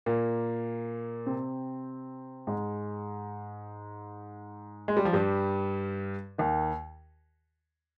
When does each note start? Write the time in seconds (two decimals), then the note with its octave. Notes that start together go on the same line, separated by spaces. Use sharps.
0.06 A#2 A#3
1.26 C3 C4
2.47 G#2 G#3
4.88 G#3
4.97 G3
5.05 F3
5.13 G2 G3
6.38 D#2 D#3